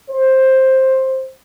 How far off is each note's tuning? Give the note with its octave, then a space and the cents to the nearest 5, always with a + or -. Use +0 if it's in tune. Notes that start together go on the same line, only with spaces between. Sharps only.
C5 +10